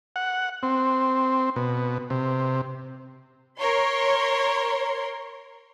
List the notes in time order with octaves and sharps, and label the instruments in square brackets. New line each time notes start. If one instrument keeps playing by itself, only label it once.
[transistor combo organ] F#5
C4
B2
C3
[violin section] A#4 C#5 C6